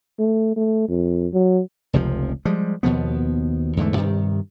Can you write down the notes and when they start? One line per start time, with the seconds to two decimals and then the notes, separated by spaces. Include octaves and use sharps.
0.19 A3
0.56 A3
0.88 F2
1.33 F#3
1.93 F1 C#2 C3 F3
2.45 F3 G3 G#3
2.83 D#2 B2 F3 B3
3.77 E2 G#2 D3 A3
3.97 G2 C3 D#3